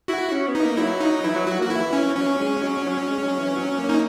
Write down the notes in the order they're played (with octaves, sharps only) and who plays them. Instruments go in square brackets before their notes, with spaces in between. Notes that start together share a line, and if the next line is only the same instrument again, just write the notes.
[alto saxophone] E4 [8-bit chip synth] F#4
[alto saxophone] C#4
B3
[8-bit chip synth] D#4
[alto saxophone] A#3
[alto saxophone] F#3 [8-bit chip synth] E4
[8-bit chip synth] D#4
[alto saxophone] E3 [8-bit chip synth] E4
[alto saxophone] F#3
[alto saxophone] F#3 [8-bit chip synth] F#4
[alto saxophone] A#3 [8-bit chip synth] F#4
[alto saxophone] E3 [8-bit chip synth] E4
[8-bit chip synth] C#4
[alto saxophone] E3
[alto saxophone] F#3 [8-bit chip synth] C#4
[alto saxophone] G#3
F#3
F#3
G#3
F#3
E3
F#3
A#3
[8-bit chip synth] D#4